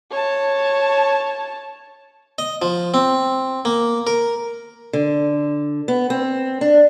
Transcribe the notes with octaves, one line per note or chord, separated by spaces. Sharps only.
C#5 A5
D#5
F3
C4
A#3
A#4
D3
B3
C4
D4